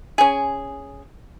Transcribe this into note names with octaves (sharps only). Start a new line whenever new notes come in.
C#4 G#4